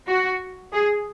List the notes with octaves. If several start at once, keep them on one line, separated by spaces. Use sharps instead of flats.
F#4
G#4